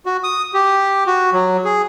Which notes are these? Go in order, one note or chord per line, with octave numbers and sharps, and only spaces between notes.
F#4
D#6
G4
F#4
F#3
G#4